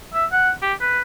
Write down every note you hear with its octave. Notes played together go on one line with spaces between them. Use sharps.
E5
F#5
G4
B4